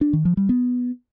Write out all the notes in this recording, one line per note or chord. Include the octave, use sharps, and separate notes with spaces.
D4
D#3
F3
G3
B3